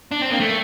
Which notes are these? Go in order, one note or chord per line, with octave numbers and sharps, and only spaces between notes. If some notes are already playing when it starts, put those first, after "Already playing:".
D4
C4
A#3
A3